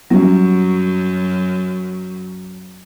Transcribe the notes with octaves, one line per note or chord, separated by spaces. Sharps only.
F#2 F#3 G3 C#4 G4